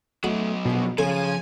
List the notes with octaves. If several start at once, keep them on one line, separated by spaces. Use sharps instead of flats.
F#3 A3 F#4 D#5
A#1 B2
C#3 F3 A4 G#5